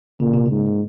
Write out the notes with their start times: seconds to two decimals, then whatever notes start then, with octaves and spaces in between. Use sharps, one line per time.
0.20 A#2 C#3
0.33 C3
0.46 G#2 C#3